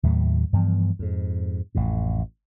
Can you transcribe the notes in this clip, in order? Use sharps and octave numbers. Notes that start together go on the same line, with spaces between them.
D#2 A2 F#3 A3
G2 E3 F3 B3
F2 G#2
A1 F2 A2